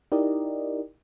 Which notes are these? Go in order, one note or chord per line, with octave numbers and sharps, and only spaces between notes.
D#4 E4 G4 A#4 D5 D#5